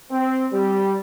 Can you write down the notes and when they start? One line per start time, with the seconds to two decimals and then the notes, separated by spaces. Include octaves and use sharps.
0.11 C4
0.52 G3